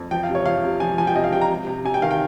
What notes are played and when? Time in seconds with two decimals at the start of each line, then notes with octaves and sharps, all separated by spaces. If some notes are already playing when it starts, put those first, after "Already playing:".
Already playing: F2
0.11 F3 G5
0.23 F5
0.29 C3
0.35 C#5
0.46 F3 F5
0.64 C3
0.80 F3 G#5
0.98 F3 G#5
1.07 G5
1.16 C3 D#5
1.24 F5
1.33 C3 G5
1.41 A#5
1.51 C3
1.67 C3
1.85 C3 G#5
1.94 G5
2.02 D#3 F5
2.11 G5